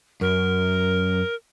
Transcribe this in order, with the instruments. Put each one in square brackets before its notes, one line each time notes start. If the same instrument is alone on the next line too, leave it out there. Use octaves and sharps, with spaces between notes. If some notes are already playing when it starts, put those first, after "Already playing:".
[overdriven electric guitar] F#2 [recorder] A#4